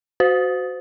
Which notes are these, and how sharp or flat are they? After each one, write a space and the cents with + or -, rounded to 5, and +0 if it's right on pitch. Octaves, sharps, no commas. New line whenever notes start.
F#4 +0 C5 -30